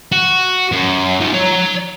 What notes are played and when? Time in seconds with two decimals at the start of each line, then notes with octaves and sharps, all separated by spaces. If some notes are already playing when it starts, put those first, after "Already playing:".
0.12 F#4
0.72 F#2
1.21 D#4 F4
1.34 C#5 A#5